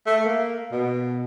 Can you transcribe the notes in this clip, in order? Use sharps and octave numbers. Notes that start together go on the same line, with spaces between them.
A3
A#3
B2